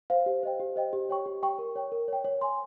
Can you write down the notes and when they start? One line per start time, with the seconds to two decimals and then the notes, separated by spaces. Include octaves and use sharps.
0.10 C5 F5
0.26 G4
0.43 C5 D#5 G5
0.60 G4
0.76 C5 D#5 G5
0.93 G4
1.09 C#5 G5 C#6
1.26 G4
1.42 C#5 G5 C#6
1.59 A#4
1.76 C#5 G5
1.92 A#4
2.08 C#5 G5
2.24 C#5
2.41 G#5 C6